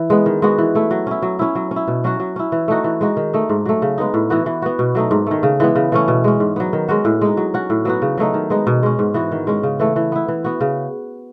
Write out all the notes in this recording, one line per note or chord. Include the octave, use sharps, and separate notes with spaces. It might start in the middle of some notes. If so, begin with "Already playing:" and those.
Already playing: E3
G#3 B3
D#3
G#3 B3 F#4
E3
A3 E4
F#3
C#4 E4
F#3
C#4 E4
F#3
C#4
E4
B2
F#3 C#4 F#4
F#3
C#4 E4
E3
A3 D#4 F#4
E3
G#3 D#4 F#4
D#3
A3 D#4
G#2
F#3 A3
C#3
G#3 B3 D#4
A2
E3 B3 F#4
E3
B3 F#4
B2
F#3 A3 D#4
G#2
D#3 A3
C#3
E3 G#3 B3
C#3
E3 A3 C#4
B2
G#3 C#4
G#2
F#3 B3
D#3
G#3 C#4 F#4
A2
G#3 D#4
F#3
C#4 F#4
A2
F#3 B3 F#4
C#3
F#3 A3 D#4
D#3
G#3 B3 D#4
B2
G#3 C#4
G#2
E3 B3 F#4
D#3
G#3 C#4
C#3
E3 A3
E3
B3 E4
E3
B3 F#4
C#3